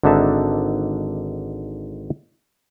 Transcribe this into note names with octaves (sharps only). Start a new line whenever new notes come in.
G#1 D3 D4 D#4 E5 A5